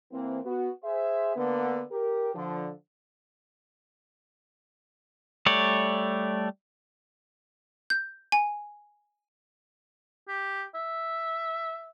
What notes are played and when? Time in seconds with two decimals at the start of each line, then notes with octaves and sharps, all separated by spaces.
0.12 E3 A#3 C4
0.44 B3 F#4
0.84 G#4 C5 E5
1.36 D3 A#3 B3
1.91 G4 A#4
2.35 D3 F3
5.46 G3 A3 C#5 D5
7.90 G6
8.32 G#5
10.28 G4
10.75 E5